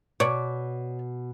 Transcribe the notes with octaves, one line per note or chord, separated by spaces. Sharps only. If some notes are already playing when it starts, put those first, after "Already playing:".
B2 C#5 D5